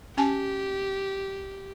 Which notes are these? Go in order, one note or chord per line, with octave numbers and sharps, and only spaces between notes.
C#4 G4 G#5 A5